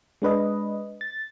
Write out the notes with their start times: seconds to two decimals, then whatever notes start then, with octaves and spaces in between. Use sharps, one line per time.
0.22 G#3 D4 B4 D#5
1.01 A6